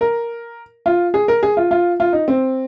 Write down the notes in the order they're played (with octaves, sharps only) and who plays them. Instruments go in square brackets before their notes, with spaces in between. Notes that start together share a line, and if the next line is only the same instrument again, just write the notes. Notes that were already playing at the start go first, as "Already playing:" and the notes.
[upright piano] A#4
F4
G#4
A#4
G#4
F4
F4
F4
D#4
C4